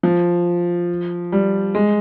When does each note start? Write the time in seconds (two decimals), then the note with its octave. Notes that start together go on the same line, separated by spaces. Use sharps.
0.03 F3
1.32 G3
1.75 G#3